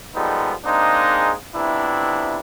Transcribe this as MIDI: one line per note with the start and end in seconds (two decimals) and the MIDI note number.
0.14 0.53 53
0.14 0.53 55
0.14 0.53 56
0.14 0.53 59
0.14 0.53 63
0.14 0.53 69
0.64 1.33 56
0.64 1.33 58
0.64 1.33 60
0.64 1.33 62
0.64 1.33 63
0.64 1.33 68
1.54 2.40 41
1.54 2.40 48
1.54 2.40 59
1.54 2.40 62
1.54 2.40 64